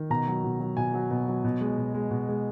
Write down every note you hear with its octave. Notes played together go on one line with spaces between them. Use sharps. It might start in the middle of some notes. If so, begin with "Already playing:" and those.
Already playing: D#3
B2 A#5
F#3
B2
F#3
B2 G#5
F#3
B2
F#3
B2
G#3
B2
G#3
B2
G#3